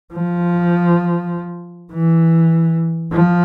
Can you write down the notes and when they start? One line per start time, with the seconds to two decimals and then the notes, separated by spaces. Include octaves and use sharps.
0.14 F3
1.93 E3
3.13 F3